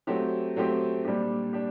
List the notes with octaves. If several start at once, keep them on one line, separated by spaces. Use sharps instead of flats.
F#3 A3 C4 G4
F#3 A3 C4 G4
A#2 G3 D4 G4
D4 G4